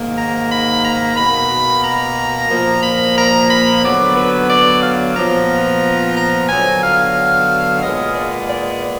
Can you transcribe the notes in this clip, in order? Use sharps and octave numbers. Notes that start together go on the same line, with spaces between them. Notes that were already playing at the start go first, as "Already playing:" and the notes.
Already playing: G#2 D#3 A#3
A#5
B5
A#5
B2 A#3 B5
A#5
A#2 F3 A#3
B5
A#5
B5
D3 F#3 B3 D5
B4
D5
F5
A#2 F3 B3 A#5
A#5
D3 F#3 B3 G#5
F5
A#2 G#3 B3 D#5
D5
D5